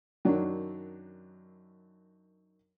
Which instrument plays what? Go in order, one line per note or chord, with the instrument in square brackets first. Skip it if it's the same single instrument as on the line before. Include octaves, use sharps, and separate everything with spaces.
[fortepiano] F#2 D#3 F#3 D4